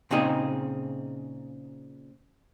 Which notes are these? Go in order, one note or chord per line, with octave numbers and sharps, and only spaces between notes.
A#2 C#3 C4 D#4 G#4